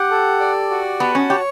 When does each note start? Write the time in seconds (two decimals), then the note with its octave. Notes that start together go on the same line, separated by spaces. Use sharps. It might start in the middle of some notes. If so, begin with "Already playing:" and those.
Already playing: G4 F#5
0.11 A4
0.40 D5
0.70 F#4
1.00 B3 A5
1.15 C#4
1.30 G4 C#5